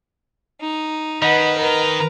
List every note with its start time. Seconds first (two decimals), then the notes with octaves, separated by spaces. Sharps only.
0.61 D#4
1.22 D#3 B4 D#5 F#5
1.58 A#4 B4 A#5